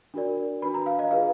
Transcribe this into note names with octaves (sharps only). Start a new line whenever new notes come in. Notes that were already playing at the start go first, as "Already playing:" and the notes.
D4 F#4 A#4 D5
D4 F#4 B4 B5
A#5
F5
D#5
F4 G#4 B4 F5